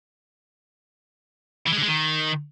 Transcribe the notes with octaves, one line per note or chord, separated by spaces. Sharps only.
E3
G#3
D3
G#3
D#3